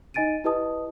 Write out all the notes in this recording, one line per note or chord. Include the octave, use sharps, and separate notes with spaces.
D#4 D#5 G#5 A6 D7 D#7
E4 G4 B4 D#5 A5 D#6